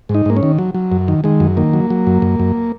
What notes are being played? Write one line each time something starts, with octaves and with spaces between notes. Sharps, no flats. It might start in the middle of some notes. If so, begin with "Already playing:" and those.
G#2
D#4
G#2 A#3
C#4
D#3
F#3
F#3
F#2
D#3
D#3 G#3
F#2
D#3 A#3
F#3
F#3
F#2
F#2
F#2